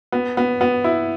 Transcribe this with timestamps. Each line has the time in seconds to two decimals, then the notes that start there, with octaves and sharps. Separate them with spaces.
0.12 B3
0.37 B3
0.61 B3
0.84 E4